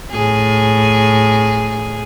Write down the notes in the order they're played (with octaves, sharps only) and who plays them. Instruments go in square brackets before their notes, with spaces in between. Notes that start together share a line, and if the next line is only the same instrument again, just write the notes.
[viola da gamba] A2 G#4